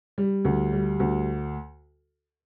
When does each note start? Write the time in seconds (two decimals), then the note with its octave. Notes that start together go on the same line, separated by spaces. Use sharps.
0.18 G3
0.45 D2
0.72 G3
1.00 D2